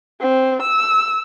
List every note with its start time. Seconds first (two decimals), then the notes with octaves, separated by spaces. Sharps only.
0.21 C4
0.62 E6